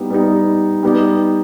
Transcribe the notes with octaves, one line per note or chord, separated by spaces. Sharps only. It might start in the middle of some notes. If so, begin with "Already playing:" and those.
Already playing: G3 B3 D#4
G3 B3 D#4
G3 B3 D#4 G4